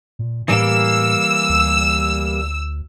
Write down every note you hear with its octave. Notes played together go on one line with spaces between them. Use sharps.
A#2
A2 E3 G3 A#3 E6
D2